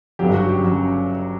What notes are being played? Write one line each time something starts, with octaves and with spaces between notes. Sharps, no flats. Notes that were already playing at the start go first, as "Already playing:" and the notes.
G1 F#2 C#3 F#3 G4
F#4
G4
C#3 F#3